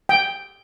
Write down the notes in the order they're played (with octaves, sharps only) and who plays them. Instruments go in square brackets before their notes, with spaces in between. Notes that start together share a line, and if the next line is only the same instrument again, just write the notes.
[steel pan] G5